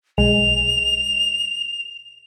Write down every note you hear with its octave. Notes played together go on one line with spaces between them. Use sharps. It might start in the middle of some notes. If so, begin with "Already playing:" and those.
B1 G#3 F7